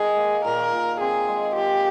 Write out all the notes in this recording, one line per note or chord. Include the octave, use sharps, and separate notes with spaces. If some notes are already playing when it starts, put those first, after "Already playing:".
Already playing: D#3 D#4 G#4
A#3
A#2 A#4
A#2
C4 G#4
G#3
F3 G4